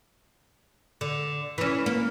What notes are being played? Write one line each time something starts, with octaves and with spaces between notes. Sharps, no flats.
D3
E3 C#4
A#3